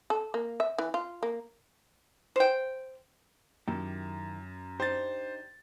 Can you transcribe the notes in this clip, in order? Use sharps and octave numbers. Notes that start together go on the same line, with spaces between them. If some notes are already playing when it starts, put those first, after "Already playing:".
A4
A#3
E5
E3
F4
A#3
C5 G5
F#2 D#3 E4 G4
D4 D#4 G4 C5 A6